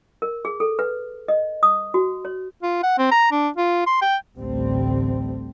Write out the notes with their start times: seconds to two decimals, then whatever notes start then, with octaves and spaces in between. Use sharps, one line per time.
0.22 A#4
0.45 G#4
0.60 A4
0.79 B4
1.28 D#5
1.63 D#6
1.94 F#4
2.25 C#5
2.63 F4
2.83 F#5
2.98 C4
3.12 A#5
3.32 D4
3.56 F4
3.86 C6
4.02 G5
4.36 A1 D2 A2 G3 A3 C4